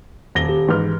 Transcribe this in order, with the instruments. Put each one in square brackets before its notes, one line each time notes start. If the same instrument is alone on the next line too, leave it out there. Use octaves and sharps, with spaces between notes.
[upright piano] D#1 A#6 G7 [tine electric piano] E2
[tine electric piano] G4
[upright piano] G#2 B4 F6 [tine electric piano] E3